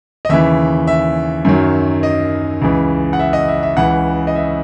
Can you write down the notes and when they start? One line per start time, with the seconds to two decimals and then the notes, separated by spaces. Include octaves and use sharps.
0.25 D#5
0.29 D#2 C#3 E3 E5
0.87 E5
1.45 F#2 D#3 F#3
2.03 D#5
2.62 C#2 C#3 E3
3.13 F#5
3.19 E5
3.33 D#5
3.48 E5
3.63 E5
3.77 C#2 C#3 E3 F#5
4.27 D#5
4.35 E5